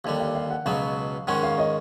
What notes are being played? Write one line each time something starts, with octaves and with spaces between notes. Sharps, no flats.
D#2 D3 G3 F5
F5
F5
F#5
C#2 B2 F#3 B3 F5
G#2 D#3 G#3 C#4 F#5
F5
D#5